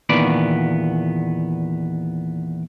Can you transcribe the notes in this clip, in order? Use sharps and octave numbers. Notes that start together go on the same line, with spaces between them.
E2 A#2 D#3 B3 B4 D5